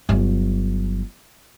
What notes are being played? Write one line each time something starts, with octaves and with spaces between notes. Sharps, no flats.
G1 F#3